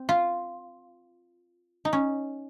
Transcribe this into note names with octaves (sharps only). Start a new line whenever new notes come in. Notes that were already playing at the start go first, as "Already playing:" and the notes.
Already playing: C4
F4
D#4
C#4